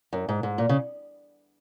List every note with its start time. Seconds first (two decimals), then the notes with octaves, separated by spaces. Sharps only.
0.13 F#2
0.29 G#2
0.43 G#2
0.58 A#2
0.69 C#3